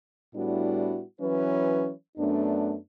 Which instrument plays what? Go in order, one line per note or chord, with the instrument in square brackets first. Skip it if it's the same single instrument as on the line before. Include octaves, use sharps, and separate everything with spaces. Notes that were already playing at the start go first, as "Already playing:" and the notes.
[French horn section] A2 G3 B3 D4 E4 F#4
E3 F#3 C#4 B4
F#2 A3 B3 D4